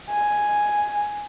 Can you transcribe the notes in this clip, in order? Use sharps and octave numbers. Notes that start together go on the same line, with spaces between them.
G#5